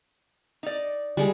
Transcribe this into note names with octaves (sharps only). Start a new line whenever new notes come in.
D#4 D5
G3 G#3 G#4